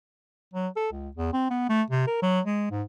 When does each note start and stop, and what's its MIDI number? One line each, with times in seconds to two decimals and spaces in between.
0.54 0.68 54
0.77 0.88 69
0.92 1.09 37
1.17 1.29 40
1.33 1.49 60
1.50 1.65 59
1.69 1.82 57
1.91 2.04 48
2.07 2.18 70
2.22 2.40 54
2.46 2.71 56
2.71 2.82 44